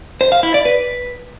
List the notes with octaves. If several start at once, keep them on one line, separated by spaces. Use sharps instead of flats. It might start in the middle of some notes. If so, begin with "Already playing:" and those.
C5
F5
E4
D5
B4